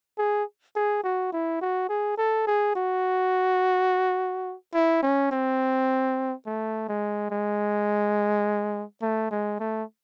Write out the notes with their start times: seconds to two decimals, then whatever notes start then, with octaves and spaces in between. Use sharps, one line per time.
0.18 G#4
0.76 G#4
1.04 F#4
1.32 E4
1.61 F#4
1.89 G#4
2.18 A4
2.47 G#4
2.76 F#4
4.74 E4
5.03 C#4
5.32 C4
6.46 A3
6.89 G#3
7.31 G#3
9.02 A3
9.31 G#3
9.60 A3